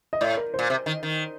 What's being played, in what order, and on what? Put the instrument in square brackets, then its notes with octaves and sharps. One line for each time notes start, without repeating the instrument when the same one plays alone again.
[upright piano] D#5
[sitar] A2 [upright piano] D5
[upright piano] A#4
[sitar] A#2 [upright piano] C5
[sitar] C3
D#3
D#3